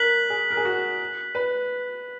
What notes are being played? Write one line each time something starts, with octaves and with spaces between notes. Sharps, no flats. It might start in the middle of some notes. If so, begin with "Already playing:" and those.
Already playing: A#4 F#6 B6 F#7
G#4
A#4
G#4
F#4
B4